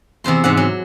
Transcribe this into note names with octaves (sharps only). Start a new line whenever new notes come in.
E2 C3 C5 C6
G#2 C3 F#5
F#3